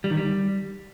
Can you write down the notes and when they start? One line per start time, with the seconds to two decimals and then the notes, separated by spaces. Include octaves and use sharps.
0.04 G3
0.11 D#3
0.17 G3